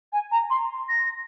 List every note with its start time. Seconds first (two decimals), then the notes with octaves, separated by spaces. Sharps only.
0.12 G#5
0.31 A#5
0.50 C6
0.88 A#6